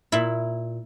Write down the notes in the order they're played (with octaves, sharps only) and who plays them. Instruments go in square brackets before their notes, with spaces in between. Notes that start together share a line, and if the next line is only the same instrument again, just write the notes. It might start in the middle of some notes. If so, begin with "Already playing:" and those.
[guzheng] A#2 E4